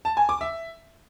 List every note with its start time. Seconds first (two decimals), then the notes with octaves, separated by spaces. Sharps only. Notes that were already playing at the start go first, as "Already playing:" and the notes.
0.05 A5
0.17 G#5
0.29 D6
0.41 E5